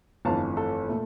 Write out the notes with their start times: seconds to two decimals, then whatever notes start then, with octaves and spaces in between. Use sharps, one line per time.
0.25 G1 F2 E3 A3 F5 A5
0.57 A4
0.89 A#2 A3